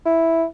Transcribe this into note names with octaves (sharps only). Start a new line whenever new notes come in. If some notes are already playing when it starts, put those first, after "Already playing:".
E4